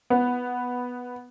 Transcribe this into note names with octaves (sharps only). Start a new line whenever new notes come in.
B3